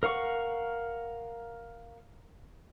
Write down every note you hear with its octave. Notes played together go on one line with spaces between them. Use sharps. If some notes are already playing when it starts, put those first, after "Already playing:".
A#4 F5 F#5 C#6